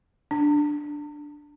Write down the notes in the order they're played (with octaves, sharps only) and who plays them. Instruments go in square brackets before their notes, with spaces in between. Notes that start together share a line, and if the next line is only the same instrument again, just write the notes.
[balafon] D4